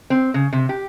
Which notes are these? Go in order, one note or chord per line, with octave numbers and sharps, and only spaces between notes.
C4
C#3
C3
G4